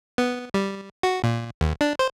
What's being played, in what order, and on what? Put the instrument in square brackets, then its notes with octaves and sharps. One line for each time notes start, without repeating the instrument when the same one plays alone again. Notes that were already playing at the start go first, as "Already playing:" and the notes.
[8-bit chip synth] B3
G3
F#4
A#2
D#2
D4
C5